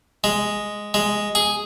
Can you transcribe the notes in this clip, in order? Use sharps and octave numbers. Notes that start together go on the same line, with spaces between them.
G#3
G#3
G#4